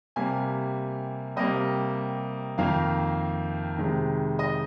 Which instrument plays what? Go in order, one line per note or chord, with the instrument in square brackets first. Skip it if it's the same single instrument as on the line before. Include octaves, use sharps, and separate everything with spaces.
[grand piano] C3 G3 A#3 G#5
C3 G3 A#3 D#5
F2 D#3 A#3 F5
C3 D#3 G#3
D#5